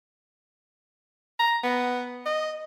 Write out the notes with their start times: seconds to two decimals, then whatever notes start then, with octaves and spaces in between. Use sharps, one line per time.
1.39 A#5
1.63 B3
2.26 D#5